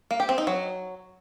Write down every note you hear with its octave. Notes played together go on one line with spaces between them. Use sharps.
A#3
G4
C4
D#4
F#3